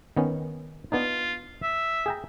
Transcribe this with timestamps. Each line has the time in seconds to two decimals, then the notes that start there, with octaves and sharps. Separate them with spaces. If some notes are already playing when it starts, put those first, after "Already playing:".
0.17 D#3 B3 C#4
0.92 B3 D4 D#4 F4
1.63 E5
2.06 G#4 G5 A#5